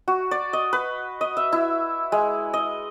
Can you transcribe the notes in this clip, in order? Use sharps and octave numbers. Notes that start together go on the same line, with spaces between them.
F#4
D5
D#5
B4
D#5
E5
E4
G#3
D#5